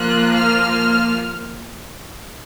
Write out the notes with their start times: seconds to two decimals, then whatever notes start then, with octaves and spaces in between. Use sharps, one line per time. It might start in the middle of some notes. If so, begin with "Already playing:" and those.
Already playing: F3 A#3 F4 F#6
0.37 F6